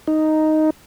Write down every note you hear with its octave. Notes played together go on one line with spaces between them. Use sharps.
D#4